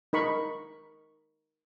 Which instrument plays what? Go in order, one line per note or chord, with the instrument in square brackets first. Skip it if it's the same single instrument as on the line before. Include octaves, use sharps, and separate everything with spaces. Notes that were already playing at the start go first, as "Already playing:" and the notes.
[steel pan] D#4 A#4 B5 C#6